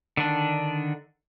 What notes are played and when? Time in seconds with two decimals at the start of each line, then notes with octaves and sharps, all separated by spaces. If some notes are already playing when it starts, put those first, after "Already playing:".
0.17 D3 D#3 D4